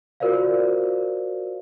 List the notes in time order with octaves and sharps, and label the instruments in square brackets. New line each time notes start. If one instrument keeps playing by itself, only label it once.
[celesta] F4 F#4 A#4 C5 D5 F5